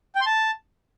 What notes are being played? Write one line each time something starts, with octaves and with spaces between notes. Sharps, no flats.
G5
C6
A5